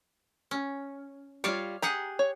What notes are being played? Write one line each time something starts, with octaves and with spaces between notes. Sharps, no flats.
C#4
G3 F4 C#5 D5 F5
G4 G#4 F#5 A#5
C#5